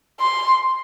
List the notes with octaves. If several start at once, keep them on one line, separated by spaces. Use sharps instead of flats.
C6